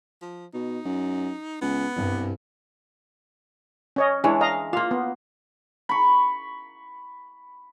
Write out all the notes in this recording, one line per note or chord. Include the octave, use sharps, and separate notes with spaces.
F3
B2 D#4
F#2
C#2 B3
C2 G2
C#4 C#5 D#5
E3 G#3 D4 C#5
D#5 F5 A#5
A#3 F4 F5
B3
B5 C#6